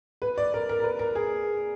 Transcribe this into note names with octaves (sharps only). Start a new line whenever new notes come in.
B4
D5
A#4
A#4
A#4
B4
A#4
G#4